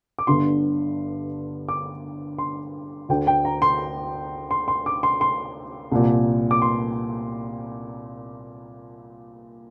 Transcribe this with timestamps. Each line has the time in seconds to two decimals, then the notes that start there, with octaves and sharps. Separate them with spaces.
0.19 D6
0.27 G1 G2 D3 C6
1.69 D6
2.38 C6
3.09 D2 D3 G5
3.27 G5
3.45 A#5
3.62 C6
4.51 C6
4.68 C6
4.86 D6
5.03 C6
5.21 C6
5.92 C2 A#2
6.51 D6
6.62 C6